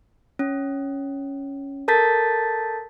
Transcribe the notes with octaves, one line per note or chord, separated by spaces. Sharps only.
C#4
A4 A#4 A5 G6 A6 B6